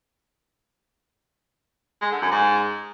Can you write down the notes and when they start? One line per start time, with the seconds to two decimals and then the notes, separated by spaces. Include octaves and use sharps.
2.02 G#3
2.12 D3
2.22 F#2
2.32 G#2